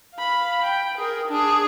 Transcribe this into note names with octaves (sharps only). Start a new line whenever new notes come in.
F5 B5
G5
G#4 A#4
D4 G#4